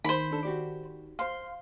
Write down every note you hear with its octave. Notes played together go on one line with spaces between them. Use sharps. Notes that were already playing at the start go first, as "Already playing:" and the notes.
D#3 C5 B5
D4 A4
F#4 G4 D5
C5 F5 C6